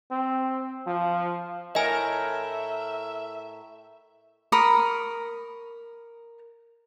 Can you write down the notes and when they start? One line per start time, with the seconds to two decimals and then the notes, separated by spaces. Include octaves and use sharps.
0.11 C4
0.87 F3
1.75 A2 A#4 D#5 E5 G#5
4.52 A#4 B5 C#6 D#6